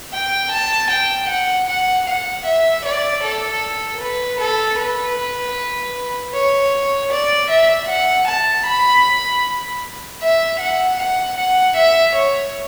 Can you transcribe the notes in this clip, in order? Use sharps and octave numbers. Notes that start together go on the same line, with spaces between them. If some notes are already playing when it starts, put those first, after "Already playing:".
G5
A5
G5
F#5
F#5
F#5
E5
D5
A4
B4
A4
B4
C#5
D5
E5
F#5
A5
B5
E5
F#5
F#5
F#5
E5
C#5